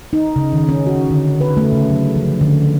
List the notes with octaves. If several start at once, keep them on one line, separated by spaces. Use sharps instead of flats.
D#4
C#3
D#3
C#4
F#4
D3
B4
A3
C#3
F#3
F3
D3